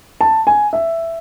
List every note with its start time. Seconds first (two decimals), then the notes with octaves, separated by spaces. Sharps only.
0.21 A5
0.47 G#5
0.73 E5